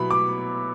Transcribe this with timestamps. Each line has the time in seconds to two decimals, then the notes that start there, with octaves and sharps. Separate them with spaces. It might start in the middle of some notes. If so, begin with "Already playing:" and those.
Already playing: B2 F#3 B3 E4 B5
0.11 D6